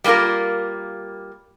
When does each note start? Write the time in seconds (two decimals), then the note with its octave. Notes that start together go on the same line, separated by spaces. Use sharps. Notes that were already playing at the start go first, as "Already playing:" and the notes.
0.04 G3 A#3 C#4 F4 A#4